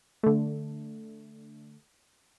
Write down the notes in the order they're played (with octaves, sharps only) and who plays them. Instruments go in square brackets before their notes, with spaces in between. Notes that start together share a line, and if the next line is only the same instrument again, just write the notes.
[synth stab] D3 A3